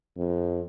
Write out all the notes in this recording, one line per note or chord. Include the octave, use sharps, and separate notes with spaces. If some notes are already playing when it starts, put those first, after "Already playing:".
F2